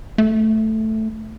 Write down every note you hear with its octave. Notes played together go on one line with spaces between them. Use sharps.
A3